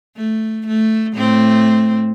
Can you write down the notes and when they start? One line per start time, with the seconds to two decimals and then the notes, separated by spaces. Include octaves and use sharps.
0.16 A3
0.67 A3
1.14 A2 A3 C4